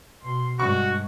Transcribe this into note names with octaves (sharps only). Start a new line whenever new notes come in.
B2 C6
G2 G#3 F#4 C#6